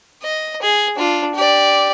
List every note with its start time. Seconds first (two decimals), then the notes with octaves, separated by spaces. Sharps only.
0.23 D#5
0.62 G#4
0.96 D4 F4
1.35 G4 D5